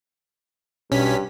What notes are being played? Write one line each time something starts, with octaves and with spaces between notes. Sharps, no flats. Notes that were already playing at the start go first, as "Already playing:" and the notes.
B1 G2 C#4 B6